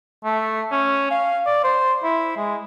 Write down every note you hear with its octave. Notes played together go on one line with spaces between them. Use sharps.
A3
C#4
F5
D5
C5
E4
G#3